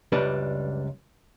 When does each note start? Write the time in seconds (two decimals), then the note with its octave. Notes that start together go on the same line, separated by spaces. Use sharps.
0.12 C#2 F#2 G3 D4 B4